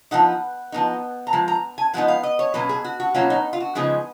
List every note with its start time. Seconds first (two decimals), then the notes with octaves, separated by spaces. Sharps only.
0.11 F3 B3 D#4 F#5
0.72 F3 B3 D#4
1.27 A#5
1.33 F3 G#3
1.48 A#5
1.78 G#5
1.94 F3 G#3 B3 D#4 F#5
2.08 F5
2.23 D#5
2.39 C#5
2.54 B2 F#3 A#3 C#4 B4
2.69 G#4
2.85 F#4
3.00 F#4
3.14 B2 F#3 A#3 C#4 F4
3.30 D#4
3.53 F4
3.60 F#4
3.75 C#3 F3 G#3 B3 D#4 G#4